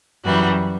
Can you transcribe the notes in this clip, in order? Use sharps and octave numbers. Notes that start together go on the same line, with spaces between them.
F#2 E3 G3 F#4